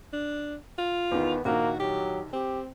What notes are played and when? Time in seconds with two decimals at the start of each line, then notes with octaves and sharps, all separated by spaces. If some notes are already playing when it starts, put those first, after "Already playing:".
0.13 D4
0.79 F4
1.11 E2 D#3 B3
1.45 A#1 D#3 A#3 F#4
1.80 F#3 G4
2.33 C4 G4